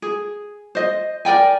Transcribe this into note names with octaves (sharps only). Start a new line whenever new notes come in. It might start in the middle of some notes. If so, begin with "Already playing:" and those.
G#4
C5 D#5
A#4 D5 G5 G#5